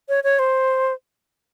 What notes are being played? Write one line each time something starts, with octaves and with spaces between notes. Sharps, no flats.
C#5
C#5
C5